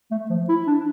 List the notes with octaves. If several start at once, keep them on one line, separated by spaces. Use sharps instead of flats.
A3
F3
E4
D4